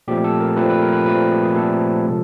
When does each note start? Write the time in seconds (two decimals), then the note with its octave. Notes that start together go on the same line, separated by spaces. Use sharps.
0.08 A#2 F3 A3 C4 G4
0.24 A4
0.40 A#4
0.56 A#2 F3 A3 C4 B4
0.70 B4
0.82 A#4
0.93 B4
1.06 A#2 F3 A3 C4 B4
1.31 G#4
1.43 G#4
1.55 A#2 F3 A3 C4 A4
2.05 C3 F3 G#3